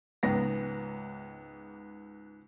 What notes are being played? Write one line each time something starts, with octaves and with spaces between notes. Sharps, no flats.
C#2 G#2 B3 A#6